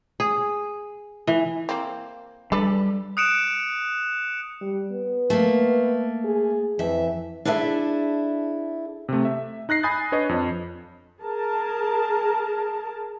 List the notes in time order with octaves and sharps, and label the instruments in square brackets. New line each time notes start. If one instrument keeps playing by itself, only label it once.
[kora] G#4
E3
[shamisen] A#3 C4
[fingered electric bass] G3 [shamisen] D4 A4 B4
[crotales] D#6 F#6 C#7 D7 E7
[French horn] G3
B3
[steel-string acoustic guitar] A3 A#3
[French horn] G#4
[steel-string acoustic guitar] F2 E5 [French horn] E3
[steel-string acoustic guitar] D4 E4 G#4 A4 C5 E5
[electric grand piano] C3 A3
E5
D#4 F#6 A#6 C7
G#5 B5 D#6 G6 A6
D4 B4 C#5 D#5
F2
[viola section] G#4 A#4 A5